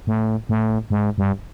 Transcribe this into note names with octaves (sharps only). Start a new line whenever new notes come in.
A2
A2
G#2
G2